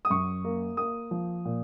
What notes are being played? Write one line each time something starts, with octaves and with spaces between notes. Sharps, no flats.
D#6
F#2 C#6
A#3
A#3 D#6
F3
A#2